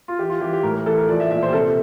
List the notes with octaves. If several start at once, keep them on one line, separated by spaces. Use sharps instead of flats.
F4
E3 G4
F4
E3 G4
G4
A2 A#4
A#4
E3 A4
A#4
F3 D5
E5
A#2 E5
C5
G4
C3 A4